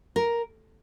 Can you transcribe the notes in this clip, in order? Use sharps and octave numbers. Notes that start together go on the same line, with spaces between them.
A#4